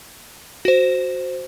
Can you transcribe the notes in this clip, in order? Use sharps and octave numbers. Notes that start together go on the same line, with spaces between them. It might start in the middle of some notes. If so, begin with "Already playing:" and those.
F#4 C5